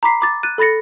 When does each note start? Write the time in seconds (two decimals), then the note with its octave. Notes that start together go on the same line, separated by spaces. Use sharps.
0.03 A#5 B5 D6 B6 C7
0.21 B5 D6 A6
0.43 F#6 A6 D#7
0.58 A4 B5 A6 A#6 C#7